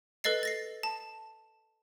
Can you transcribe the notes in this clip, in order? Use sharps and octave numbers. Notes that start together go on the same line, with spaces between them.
A4 B4 D#5 A6 C7
A6 A#6 C7
A5